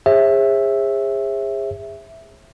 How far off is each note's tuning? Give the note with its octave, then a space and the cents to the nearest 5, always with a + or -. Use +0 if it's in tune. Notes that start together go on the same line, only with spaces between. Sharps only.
G#4 -30 C#5 -45 E5 +0